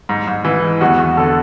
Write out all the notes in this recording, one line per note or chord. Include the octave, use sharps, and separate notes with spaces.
G#2
G#2
E3
G#3
E2 F#4
E2
D3 A4